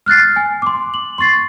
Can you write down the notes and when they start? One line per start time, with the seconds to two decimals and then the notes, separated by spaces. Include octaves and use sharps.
0.06 F6 F#6 A6 C7
0.36 G#5
0.62 C6 D6
0.94 F#7
1.18 C6 C#6 A6 C7